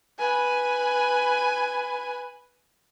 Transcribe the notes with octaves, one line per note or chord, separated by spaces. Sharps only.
B4 G#5